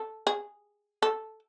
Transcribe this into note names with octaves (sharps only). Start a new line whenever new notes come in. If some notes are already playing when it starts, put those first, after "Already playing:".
Already playing: A4
G#4
A4